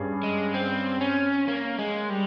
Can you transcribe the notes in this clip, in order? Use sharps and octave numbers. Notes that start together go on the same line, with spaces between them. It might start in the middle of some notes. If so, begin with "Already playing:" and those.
Already playing: G2 G3 C#4 G#4
G#3
C4
C#4
A#3
G#3
G3